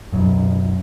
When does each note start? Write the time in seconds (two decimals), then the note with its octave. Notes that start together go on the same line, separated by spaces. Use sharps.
0.12 C#2 F#2 B2 F#3